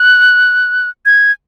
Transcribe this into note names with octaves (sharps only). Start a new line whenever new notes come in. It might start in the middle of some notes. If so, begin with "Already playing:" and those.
Already playing: F#6
G#6